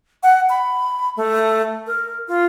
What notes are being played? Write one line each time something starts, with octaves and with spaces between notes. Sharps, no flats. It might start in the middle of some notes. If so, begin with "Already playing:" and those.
F#5
B5
A3
A#4
F4